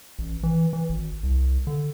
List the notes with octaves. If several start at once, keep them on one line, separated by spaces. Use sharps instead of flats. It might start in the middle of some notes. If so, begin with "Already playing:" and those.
A1
E3
E3
G#1
C2
D3